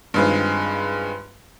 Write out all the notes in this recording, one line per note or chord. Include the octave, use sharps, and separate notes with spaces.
G2 D#3 G#3 C4 F4